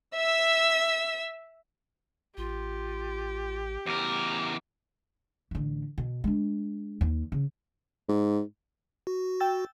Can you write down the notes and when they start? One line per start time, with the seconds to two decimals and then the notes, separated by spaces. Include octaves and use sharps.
0.14 E5 E6
2.37 A1 F4 G4
3.86 E2 A#4 D6
5.51 A1 D3
5.98 B2
6.24 G#3 D4
7.01 D#2
7.32 C#3
8.09 G#2
9.07 F#4
9.40 G5 E6 A6